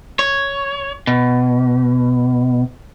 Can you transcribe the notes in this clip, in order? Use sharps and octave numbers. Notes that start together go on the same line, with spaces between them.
C#5
B2